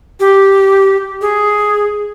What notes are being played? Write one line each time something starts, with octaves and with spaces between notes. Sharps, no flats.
G4
G#4